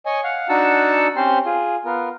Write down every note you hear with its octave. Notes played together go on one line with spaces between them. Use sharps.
C#5 D#5 G#5 D#6
F5 F#5
D4 D#4 F#4 F#5 A5 E6
C4 C#4 G4 C5 C6
F4 G#4
B3 F4 A#4